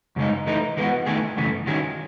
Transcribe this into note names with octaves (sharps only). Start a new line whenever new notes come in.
F#2 C#3 G#3 D#4
E3 A3 D#4
E3 G#3 B3 D#4 F#4
D#3 A3 E4 G#4
F#2 C#3 E3 A3
D#3 F#3 C#4 E4 G#4